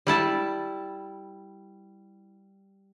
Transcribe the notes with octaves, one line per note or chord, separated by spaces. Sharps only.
G3 E4 A5